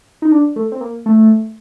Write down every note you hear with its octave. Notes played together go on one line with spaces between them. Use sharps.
D#4
D4
A3
C4
A#3
A3